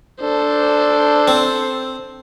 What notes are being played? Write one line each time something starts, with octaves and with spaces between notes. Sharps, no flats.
D4 A4 C5
C4